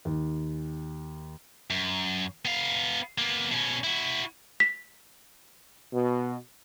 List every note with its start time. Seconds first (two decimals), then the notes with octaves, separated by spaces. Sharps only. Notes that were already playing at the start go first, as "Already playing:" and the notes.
0.05 D#2
1.70 F#2
2.45 B3 F5
3.18 A#3 B3
3.52 B2 C#4
3.84 E4 F#4
4.60 B6
5.93 B2